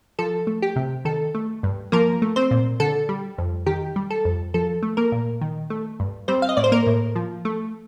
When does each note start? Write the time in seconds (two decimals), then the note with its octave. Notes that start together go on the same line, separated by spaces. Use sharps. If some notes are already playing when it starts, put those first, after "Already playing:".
0.19 F3 A4
0.47 A3
0.62 G4
0.76 C3
1.05 D#3 A4
1.35 A3
1.63 G2
1.92 F3 A#3 A#4
2.22 A3
2.36 C4 C5
2.51 A#2
2.80 D3 A4
3.09 G3
3.38 F2
3.66 D#3 G4
3.96 G3
4.10 A4
4.25 F2
4.54 F3 A4
4.83 A3
4.97 A#3 A#4
5.12 A#2
5.41 D#3
5.70 A3
6.00 G2
6.28 G3 C4 C5
6.42 F5
6.49 D#5
6.57 A2 D5
6.64 C5
6.72 A#3 A#4
6.87 A2
7.16 F3
7.45 A3